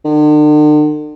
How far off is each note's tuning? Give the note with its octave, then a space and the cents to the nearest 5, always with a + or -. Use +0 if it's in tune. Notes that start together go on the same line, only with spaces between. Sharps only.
D3 +45